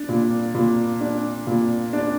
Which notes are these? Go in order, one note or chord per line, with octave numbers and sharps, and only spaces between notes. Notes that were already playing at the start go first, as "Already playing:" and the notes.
Already playing: D4
A#2
A#2
D4
A#2
D4